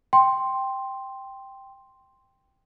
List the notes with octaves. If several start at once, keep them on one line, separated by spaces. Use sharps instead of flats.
G5 C6